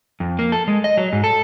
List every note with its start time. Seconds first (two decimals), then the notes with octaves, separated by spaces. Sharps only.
0.20 F2
0.39 A#3
0.52 A4
0.68 G#3
0.84 D#5
0.97 F#3
1.13 G#2
1.24 A4